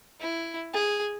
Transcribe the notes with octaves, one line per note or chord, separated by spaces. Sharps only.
E4
G#4